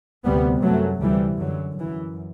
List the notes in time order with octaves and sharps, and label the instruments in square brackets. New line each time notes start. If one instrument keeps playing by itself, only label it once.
[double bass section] D2 C3 G3 B3
F#2 F#3 A3
D2 C3 E3 G3
F#2 D3 F#3
F#2 E3